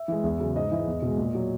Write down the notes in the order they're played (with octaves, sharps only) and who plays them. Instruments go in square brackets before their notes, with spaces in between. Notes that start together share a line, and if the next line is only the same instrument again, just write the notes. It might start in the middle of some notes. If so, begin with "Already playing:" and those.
Already playing: [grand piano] E5
E3 G#3
E2
C#3 F#3
G#2 D#5
E3 G#3
E2
B2 G#3
A#2
F#3